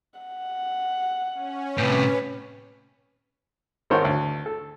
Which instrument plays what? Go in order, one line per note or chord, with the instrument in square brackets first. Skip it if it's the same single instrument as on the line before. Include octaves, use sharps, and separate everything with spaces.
[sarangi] F#5
[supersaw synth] C#4
[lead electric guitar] A2 C3 [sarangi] B4
[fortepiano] G#1 D#3 C5 C#5 F#5
D2
A4